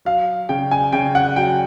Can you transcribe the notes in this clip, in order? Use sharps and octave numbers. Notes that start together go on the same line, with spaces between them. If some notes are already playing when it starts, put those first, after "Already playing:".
F#3 F5
C#3 G5
G#5
C#3 G5
F#5
F#3 G5